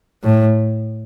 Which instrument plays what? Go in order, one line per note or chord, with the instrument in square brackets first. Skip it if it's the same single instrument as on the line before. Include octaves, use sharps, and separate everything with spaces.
[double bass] A2